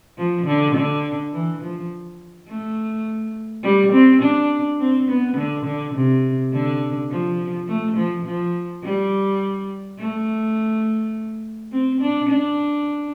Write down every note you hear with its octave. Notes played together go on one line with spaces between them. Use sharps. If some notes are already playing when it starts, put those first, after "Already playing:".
F3
D3
D3
E3
F3
A3
G3
C4
D4
C4
B3
D3
D3
C3
D3
F3
A3
F3
F3
G3
A3
C4
D4
D4